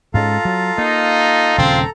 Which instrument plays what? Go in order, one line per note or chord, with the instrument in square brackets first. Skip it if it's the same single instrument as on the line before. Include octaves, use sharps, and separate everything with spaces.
[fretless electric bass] G#2 G#3 C#4 [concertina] F4 F5 [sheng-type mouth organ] A4 A#5
[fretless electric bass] F#3
[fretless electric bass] A#3 [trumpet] D#4
[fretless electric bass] D#1 C#3 [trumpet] C4